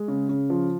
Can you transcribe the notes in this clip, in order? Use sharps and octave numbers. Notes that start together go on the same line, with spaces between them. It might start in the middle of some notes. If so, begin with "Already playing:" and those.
Already playing: G#3
C#3
C#3
F3